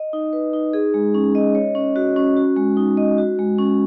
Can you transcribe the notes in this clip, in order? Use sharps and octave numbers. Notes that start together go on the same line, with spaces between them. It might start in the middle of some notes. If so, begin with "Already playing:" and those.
Already playing: D#5
D#4
B4
D#4
G#4
G#3
C#4
D#5
C#5
C#4
F#4
C#4
F#4
G#3
D#4
D#5
F#4
G#3
C#4